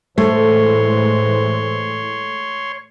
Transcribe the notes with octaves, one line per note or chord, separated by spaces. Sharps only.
A2 E3 G#3 A3 C5 C#5 C6